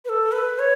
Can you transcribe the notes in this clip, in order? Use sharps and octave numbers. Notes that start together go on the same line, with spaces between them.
B4
A4
B4
C#5